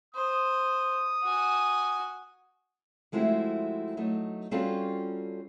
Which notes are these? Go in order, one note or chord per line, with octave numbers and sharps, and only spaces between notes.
C5 D#6
F#4 G#5
F3 G#3 A3 C4 E4 F#4
F#3 A3 D#4
G3 C4 C#4 F4 F#4 A4